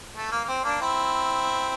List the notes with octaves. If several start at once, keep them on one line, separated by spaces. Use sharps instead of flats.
A3
A#3
A#3
C4
A#3 D4
C4 E4